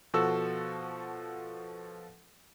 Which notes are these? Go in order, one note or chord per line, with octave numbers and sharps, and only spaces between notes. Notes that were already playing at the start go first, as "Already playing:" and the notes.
B2 F3 F#4 A4 E6